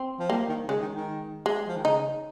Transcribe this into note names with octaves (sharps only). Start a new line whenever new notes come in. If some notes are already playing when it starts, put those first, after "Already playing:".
Already playing: C4
F3
G3 A#3
D#3
C#3 G#3
D#3
D#3
G#3
F3
D#3
C#3 D#4